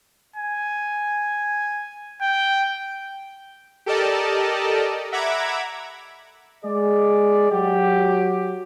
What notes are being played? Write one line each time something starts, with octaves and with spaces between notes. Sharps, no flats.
G#5
G5
G4 A4 A#4 D5 D#5 A5
E5 F#5 A#5 B5 D6 G#6
G#3 G#4 D5
F#3 F#4 G4